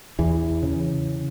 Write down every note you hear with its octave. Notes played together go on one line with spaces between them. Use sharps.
E2 E3
C#3